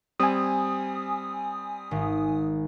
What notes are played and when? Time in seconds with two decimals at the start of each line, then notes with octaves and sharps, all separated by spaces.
0.19 G3 C4 G#5 D#6
1.91 G#1